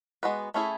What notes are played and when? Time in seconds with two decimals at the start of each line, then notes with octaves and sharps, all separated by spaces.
0.23 G#3 B3 F#4 B4
0.54 A3 C#4 E4 G#4